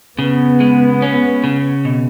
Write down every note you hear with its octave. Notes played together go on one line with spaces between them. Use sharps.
C#3 B3
G#3
C#4
C#3
B2